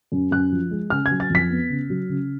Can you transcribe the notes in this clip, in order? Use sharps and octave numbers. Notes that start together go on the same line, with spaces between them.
F#2
F#2 F#6
F3
G#3
C#3 F6
G#6
F#3
A6
F2 B6
B3
C#3
F#3
C#3